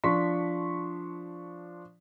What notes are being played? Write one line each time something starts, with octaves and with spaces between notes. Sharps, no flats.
F3 D4 C6 C#6 B6